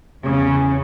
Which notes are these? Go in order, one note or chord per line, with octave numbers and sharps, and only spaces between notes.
E2 C#3 C#4